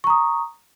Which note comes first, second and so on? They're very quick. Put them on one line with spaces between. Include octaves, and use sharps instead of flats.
C#6 A#5 D#6